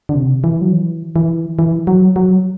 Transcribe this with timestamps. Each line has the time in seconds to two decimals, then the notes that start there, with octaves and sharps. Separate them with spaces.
0.09 D3
0.15 C3
0.44 E3
0.61 F#3
0.73 E3
1.16 E3
1.59 E3
1.87 F#3
2.16 F#3